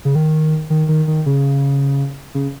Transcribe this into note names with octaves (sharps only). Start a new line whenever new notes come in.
C#3
D#3
D#3
D#3
D#3
C#3
C#3